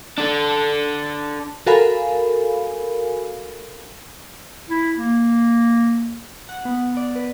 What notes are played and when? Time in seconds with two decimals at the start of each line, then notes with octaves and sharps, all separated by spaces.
0.18 D4 A4
1.66 F#4 A4 A#4 F5 G#5 B5
4.69 E4
4.97 A#3
6.49 F#5
6.65 B3
6.97 D5
7.15 B4